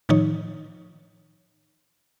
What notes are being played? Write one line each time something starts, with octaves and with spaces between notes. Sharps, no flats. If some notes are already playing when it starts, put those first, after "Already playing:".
A2 D#3 F3 D#4 C#5